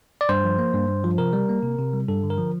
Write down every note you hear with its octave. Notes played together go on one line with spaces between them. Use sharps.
D5
G2 C5
F3
A#3
G2
G2
F3
C3 A#4
G3
A#3
C3
C3
G3
G2 A4
D3
A#4
F3